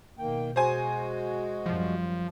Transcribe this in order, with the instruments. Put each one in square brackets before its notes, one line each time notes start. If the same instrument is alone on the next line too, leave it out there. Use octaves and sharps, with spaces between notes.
[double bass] B2 [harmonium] D#3 A#3 G5
[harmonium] G#3 F#4 [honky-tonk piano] C5 G#5
[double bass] F#2 G3 [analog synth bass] F3